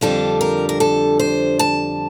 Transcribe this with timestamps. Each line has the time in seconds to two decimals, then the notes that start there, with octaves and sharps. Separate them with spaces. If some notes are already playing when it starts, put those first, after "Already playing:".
0.01 F2 D3 G3 D4 A4
0.41 A#4
0.69 A#4
0.80 A4
1.19 C5
1.59 A5